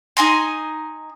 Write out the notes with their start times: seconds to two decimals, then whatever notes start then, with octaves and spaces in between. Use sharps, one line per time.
0.17 D#4 G#5 A#5 C6